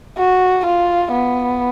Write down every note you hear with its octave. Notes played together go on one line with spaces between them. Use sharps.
F#4
F4
B3